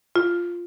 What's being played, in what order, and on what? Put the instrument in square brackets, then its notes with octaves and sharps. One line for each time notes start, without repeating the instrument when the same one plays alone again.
[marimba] F4